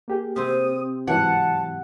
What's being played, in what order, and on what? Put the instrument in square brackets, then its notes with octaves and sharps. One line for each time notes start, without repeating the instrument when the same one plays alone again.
[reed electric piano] A#3 G4 G#4
[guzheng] C3 C4 [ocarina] D#6
[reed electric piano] G#2 E3 F#3 [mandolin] F#5 [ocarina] A5